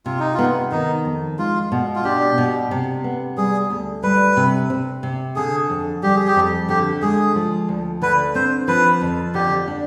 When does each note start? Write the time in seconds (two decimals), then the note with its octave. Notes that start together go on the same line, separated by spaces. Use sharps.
0.06 C3 F4
0.20 D#4
0.34 B3 F4
0.72 D#3 D#4
1.05 F2
1.38 G#3 F4
1.72 B2
1.95 F4
2.04 D4 G4
2.38 B2
2.71 C3
3.04 B3
3.37 G3 G#4
3.70 D2
4.03 G3 B4
4.37 C3
4.70 C4
5.03 C3
5.36 D3 G#4
5.70 F2
6.03 G3 G4
6.16 G#4
6.27 G4
6.36 F2
6.69 D3 G4
7.02 G#3 G#4
7.36 F3
7.69 D2
8.02 D3 B4
8.35 C4 C5
8.68 F3 B4
9.01 F2
9.34 D3 G4
9.68 D4